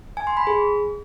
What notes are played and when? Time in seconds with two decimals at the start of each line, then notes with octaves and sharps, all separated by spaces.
0.17 G#5
0.27 C6
0.37 B5
0.47 G#4